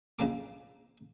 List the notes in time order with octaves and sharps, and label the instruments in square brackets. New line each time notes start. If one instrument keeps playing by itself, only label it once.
[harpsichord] A#1 C#3 A#3 A4 D6